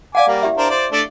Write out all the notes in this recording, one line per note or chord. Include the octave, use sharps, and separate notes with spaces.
D5 F5 F#5 G#5 D6
G3 A#3
E4 G4 E5
D4 A#4 C5
C5 D5
A3 D4 D5